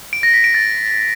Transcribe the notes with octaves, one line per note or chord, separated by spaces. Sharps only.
D7
A#6
B6
D7
A6